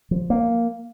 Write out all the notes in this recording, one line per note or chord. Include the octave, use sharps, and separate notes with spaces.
F3
A#3